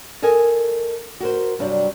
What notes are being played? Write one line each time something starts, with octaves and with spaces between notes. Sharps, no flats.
A4 A#4 D#5 G#5
F#4 A#4 C5
G2 C3 F#3 D4